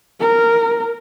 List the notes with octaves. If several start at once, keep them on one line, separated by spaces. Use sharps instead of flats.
A#4